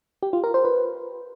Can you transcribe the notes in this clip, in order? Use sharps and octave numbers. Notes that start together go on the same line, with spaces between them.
G4
F4
A#4
C5
B4